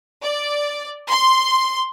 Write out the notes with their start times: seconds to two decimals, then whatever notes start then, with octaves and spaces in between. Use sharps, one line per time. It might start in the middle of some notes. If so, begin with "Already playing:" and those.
0.23 D5
1.09 C6